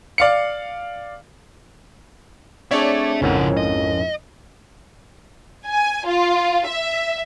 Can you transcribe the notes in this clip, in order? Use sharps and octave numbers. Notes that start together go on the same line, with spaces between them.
D5 F5 C#7
C4 D4 G#4 C#5 D5 E5 A5
A#1 F2 G#2 C#3 C#4 E4 A#4 F#5
D#5
G#5
F4
E5